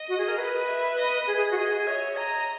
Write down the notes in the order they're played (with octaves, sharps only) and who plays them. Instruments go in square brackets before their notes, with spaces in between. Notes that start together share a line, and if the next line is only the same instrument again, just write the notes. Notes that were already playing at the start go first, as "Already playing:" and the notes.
Already playing: [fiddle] D#5
[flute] F#4
G#4
A#4
[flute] B4 [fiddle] D#5
[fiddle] E5
D#5
[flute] G#4 [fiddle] D#5
[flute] G#4
F#4
[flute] G#4 [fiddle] D#5
[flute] C#5 [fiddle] E5
[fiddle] D#5 [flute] A#5